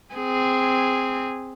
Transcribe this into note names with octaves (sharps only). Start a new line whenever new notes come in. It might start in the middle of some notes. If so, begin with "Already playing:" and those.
C4 G#4